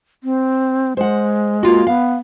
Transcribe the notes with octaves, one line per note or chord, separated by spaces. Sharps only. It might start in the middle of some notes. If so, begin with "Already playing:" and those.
C4
G#3 C5 F#5
A#3 F4 F#4
B3 F5